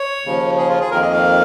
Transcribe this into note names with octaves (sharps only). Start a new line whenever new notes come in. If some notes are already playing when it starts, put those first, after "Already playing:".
Already playing: C#5
D#2 C#3 F3
G#4
F4
G#4
F2 D#3 A#3 A#4
D#5
F5